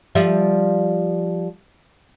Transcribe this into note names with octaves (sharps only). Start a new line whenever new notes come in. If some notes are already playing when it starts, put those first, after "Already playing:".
F3 G3 E5